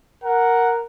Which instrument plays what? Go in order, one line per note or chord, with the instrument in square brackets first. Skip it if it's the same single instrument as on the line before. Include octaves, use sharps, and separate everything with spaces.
[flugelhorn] A#4 [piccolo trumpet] F#5